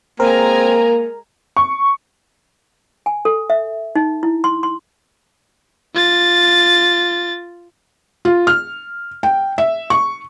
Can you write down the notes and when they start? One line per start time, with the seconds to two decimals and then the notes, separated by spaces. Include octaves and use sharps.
0.20 G#3 A#3 C4 A#4 G#5 A#5
1.57 C#6
3.06 G#5
3.25 A4
3.50 E5
3.95 D#4
4.23 E4
4.44 C6
4.63 C6
5.95 F4 A6
8.25 F4
8.47 F6
9.23 G5
9.58 E5
9.90 C#6